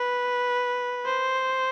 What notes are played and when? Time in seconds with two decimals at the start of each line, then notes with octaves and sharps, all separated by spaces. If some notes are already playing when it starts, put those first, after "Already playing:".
Already playing: B4
1.06 C5